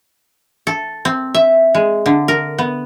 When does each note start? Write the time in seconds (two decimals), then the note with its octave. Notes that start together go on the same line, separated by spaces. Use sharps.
0.67 A4
1.05 C4
1.34 E5
1.75 G#3
2.06 D3
2.28 A#4
2.58 B3